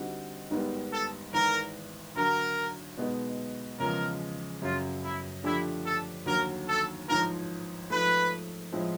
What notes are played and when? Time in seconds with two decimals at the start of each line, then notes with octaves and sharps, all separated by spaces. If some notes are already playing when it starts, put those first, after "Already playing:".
Already playing: D3 G3 C4 D#4 F#4
0.51 G#1 G#2 D#3 G3 B3
0.92 A4
1.33 G#1 G#2 E3 A#4
2.15 D2 D3 F#3 A#4
2.97 B2 G#3 B3 D#4
3.79 E2 C#3 F3 G#3 A#4
4.62 F#2 C#3 F#3 F4
5.03 E4
5.44 D3 F3 A3 D4 E4 G4
5.86 A4
6.26 D#2 D3 F#3 A#4
6.67 A4
7.08 A1 G#2 F3 A#4
7.90 G#2 F3 A3 B4
8.72 A2 F3 G#3 C4 E4